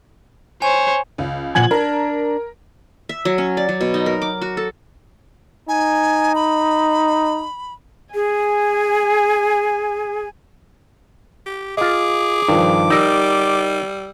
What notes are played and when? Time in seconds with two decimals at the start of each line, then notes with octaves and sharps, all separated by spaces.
0.62 C5 C#5 G#5
1.18 C#2
1.55 A#2 F3 F#5 G#5 G#6 F#7
1.71 D4 A#4
3.09 E5
3.25 F#3
3.38 C#4
3.57 D5
3.69 F#3
3.81 B2
3.94 D#4
4.06 A#4
4.22 D6
4.41 F#4
4.57 A4
5.69 D#4 G#5
6.35 B5
8.14 G#4 G#5
11.46 G4
11.77 F4 G#4 D#5 D6
12.48 G2 D#3 F3
12.90 G3 D#4 A#4 E6